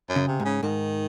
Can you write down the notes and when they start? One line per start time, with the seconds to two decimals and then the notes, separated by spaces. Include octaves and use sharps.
0.10 F#2
0.16 C#3
0.28 C3
0.40 G#2
0.45 C#3
0.63 G#2 D#3